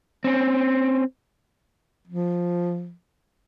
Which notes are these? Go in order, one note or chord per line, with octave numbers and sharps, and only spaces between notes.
C4 C#4
F3